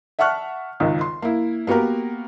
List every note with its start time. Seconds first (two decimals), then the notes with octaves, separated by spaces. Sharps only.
0.19 E5 F#5 A5 C#6 F6 F#6
0.80 G#1 C#2 D#3
1.01 C6
1.22 A#3 E4
1.67 A#3 B3 F#4 G4 A#4